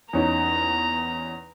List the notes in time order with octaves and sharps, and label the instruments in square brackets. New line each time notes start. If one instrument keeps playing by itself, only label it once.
[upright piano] E2 C#4 D#4 [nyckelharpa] A#5